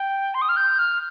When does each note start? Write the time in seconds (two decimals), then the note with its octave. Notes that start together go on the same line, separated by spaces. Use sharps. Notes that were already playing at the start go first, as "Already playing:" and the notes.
Already playing: G5
0.34 C6
0.42 D#6
0.49 F6
0.57 G6
0.79 F6